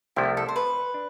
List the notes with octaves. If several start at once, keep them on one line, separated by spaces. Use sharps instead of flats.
C2 C3 F3 A3 E4 G4
A4
C5
B4
D4